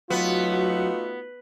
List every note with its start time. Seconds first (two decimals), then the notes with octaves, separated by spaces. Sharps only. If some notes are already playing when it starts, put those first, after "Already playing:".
0.10 F#3 A3 B3 D#4 F4 F#4